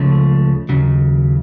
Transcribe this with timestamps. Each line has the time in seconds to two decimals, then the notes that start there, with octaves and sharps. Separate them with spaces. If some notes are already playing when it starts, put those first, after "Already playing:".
Already playing: C#2 C#3 F3 A3
0.69 D#2 C#3 F#3